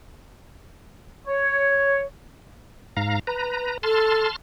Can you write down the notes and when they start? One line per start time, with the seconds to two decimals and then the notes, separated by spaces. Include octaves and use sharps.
1.27 C#5
2.97 G#2 F5 A#5
3.27 B4 A#5
3.83 A4 A5 C6 F6